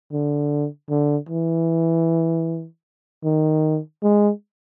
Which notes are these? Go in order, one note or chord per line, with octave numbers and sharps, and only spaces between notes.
D3
D3
E3
D#3
G#3